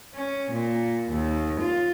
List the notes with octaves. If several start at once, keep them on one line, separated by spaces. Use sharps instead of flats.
C#4
A#2
D#2
F4